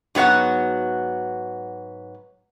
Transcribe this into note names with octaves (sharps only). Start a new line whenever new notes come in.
G#2 F#3 B3 F#4 F#5